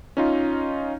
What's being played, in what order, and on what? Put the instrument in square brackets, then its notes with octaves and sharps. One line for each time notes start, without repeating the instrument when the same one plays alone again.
[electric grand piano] C#4 D#4 F4